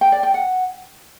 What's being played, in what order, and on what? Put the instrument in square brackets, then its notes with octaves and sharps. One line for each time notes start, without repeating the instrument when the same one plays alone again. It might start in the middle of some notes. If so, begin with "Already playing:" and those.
[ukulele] G5
D5
G5
F#5